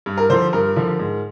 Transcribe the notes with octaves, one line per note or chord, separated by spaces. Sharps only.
G2
A#4
D3 F3 C5
G2 A#4
D3 F3
G#2